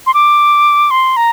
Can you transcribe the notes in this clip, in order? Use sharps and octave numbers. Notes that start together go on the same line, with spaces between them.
C6
D6
C6
A#5